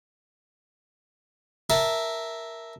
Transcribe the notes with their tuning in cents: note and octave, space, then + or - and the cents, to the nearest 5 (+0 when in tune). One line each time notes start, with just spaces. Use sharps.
A#4 +0 E5 -5 A5 +0